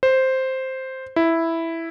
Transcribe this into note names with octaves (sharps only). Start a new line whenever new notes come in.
C5
E4